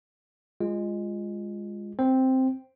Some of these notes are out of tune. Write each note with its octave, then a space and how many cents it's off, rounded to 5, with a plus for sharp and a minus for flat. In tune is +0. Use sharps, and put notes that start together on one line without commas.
G#3 -15 F4 +0
C4 +0 C5 +0